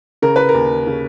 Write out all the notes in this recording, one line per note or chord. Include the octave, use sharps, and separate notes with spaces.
C#3 A#4
B4
A#4
D#2
C#3